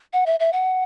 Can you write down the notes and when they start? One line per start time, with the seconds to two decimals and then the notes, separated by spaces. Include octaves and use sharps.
0.13 F#5
0.26 E5
0.40 E5
0.53 F#5